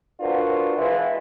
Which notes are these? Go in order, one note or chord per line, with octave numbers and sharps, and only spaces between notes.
B3 D4 F4 F#4 A#4 C5
B2 E3 G#3 F4